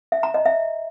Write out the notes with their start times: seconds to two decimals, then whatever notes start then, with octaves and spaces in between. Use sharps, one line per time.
0.12 E5
0.23 A#5
0.34 D#5
0.46 E5